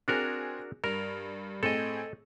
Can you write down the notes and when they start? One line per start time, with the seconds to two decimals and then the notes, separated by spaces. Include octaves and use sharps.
0.08 C4 D4 F#4 G#4 A#4
0.84 G2 A#4
1.63 A2 C4 G#4 A4 D#5